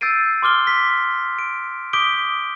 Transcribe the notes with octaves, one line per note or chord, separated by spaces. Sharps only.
E6 G6 A6 C7 D7 D#7
C6 D6 F6 G7
B6
D7
D6 D#6 G6 B6 D7 G7